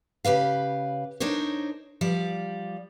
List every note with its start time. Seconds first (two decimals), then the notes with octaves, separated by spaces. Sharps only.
0.25 C#3 G4 B4 F5
1.20 D4 D#4 A#4 C5 C#5
2.01 F3 G3 D5